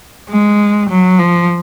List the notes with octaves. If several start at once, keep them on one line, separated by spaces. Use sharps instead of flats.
G#3
F#3
F3